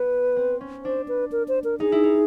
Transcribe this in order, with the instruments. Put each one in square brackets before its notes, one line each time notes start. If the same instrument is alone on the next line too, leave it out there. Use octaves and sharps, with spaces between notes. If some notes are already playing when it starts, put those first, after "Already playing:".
Already playing: [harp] B3 [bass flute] B4
[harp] C4
C#4
[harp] D4 [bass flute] C5
[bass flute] B4
A#4
C5
A#4
[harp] D#4 [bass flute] G#4
[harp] E4
D#4